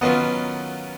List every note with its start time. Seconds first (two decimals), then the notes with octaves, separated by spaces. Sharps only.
0.01 D#3 F#3 B3 C#4 F4